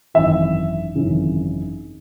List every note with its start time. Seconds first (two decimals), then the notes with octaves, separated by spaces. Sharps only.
0.14 G#1 F#2 E3 E5
0.95 G#1 F#2 C#3 E3